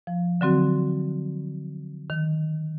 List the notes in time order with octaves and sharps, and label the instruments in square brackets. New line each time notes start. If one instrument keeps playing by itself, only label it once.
[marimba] F3
D3 F#3 C4 F#4
D#3